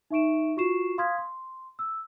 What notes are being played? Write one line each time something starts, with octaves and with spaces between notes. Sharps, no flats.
D#4 E5 C#6 D7 E7
F4 F#4 C#6 C7 E7
F5 C6 D#6 F6 G#6 B6
C6
E6